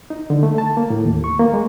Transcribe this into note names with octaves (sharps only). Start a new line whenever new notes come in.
D#4
D3
A3
A5
A#3
A2
D#2
C#6
A#3
G#3